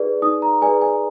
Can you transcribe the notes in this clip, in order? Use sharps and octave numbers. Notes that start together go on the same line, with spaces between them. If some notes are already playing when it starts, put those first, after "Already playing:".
Already playing: D#4 G#4 B4 D5
D#4 D#6
A#5
G#4 B4 D5 G#5
G#5